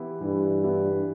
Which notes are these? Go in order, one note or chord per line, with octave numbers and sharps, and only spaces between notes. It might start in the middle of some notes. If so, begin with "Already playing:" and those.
Already playing: E3 B3 E4 G4
G2 E3
B3 E4 G4